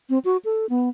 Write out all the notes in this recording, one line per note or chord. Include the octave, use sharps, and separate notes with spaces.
C4
F#4
A4
B3